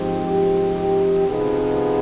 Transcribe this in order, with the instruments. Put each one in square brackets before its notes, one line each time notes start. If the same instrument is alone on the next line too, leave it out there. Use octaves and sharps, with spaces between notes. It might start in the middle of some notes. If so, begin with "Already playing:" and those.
Already playing: [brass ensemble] G#2 F3 C4 D#4 G4
C3 F3 B3 D#4 G#4